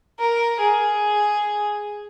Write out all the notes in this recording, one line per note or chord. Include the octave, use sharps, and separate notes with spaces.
A#4
G#4